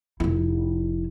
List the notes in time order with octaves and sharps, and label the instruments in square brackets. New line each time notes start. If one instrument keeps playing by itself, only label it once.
[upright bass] F1 E4